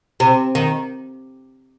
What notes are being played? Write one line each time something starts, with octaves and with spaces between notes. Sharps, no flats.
C3
D#3